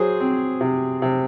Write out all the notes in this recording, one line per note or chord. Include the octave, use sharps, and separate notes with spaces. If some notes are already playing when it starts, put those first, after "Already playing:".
Already playing: F#3 G#4 C5
C4
C3
C3